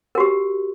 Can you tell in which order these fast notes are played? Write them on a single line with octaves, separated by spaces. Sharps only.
A#4 F#4 G4